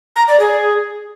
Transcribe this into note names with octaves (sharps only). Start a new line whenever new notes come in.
A#5
D5
G#4